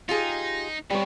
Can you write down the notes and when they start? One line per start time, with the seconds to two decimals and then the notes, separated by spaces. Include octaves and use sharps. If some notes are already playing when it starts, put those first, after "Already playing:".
0.09 D#4 F4 G4 G#4
0.90 C3 G3 B3 C#5